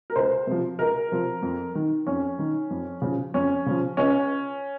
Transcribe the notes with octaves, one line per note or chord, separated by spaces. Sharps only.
A#4
C#2 C5
C3 F3
C#2 A#4
C3 F3
F2
D#3
F2 C#4
D#3
F2
C#3 F3
F2 C#4
C#3 F3
C#2 C#4